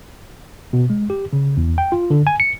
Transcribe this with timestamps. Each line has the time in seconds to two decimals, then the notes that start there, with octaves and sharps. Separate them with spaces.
0.73 B2
0.90 G#3
1.10 G4
1.33 C#3
1.57 E2
1.78 G5
1.92 F4
2.10 D3
2.27 G#5
2.40 C#7